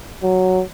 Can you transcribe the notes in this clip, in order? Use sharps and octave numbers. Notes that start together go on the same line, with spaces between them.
F#3